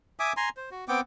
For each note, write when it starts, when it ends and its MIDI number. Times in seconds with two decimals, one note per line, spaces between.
0.20 0.33 76
0.20 0.33 80
0.20 0.33 86
0.20 0.33 87
0.37 0.49 80
0.37 0.49 82
0.37 0.49 84
0.57 0.69 72
0.71 0.85 66
0.88 1.01 59
0.88 1.01 60
0.88 1.01 79
0.88 1.01 86